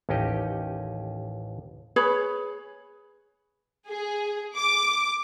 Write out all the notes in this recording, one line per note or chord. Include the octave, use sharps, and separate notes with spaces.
A1 D#2 C#4 D#4 G4 D#5
G#4 B4 C#5 B5
G#4
D6